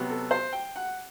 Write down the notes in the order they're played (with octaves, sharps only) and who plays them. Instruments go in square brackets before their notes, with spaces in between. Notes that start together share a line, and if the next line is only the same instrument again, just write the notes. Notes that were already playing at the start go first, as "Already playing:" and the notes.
Already playing: [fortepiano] C3 F#3 B3
A4
C5
G5
F#5